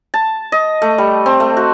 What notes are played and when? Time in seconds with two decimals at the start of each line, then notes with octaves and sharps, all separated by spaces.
0.14 A5
0.52 D#5
0.82 A3
0.98 G3
1.26 C4
1.40 A3
1.57 F#4